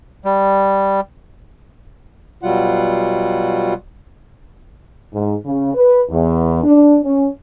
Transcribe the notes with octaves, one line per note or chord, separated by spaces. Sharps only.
G3
B2 F#3 G3 F4 F#5
G#2
C#3
B4
E2
D4
C#4